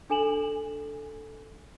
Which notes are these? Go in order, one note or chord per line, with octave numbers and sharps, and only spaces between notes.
D4 A4 G#5 E7 F#7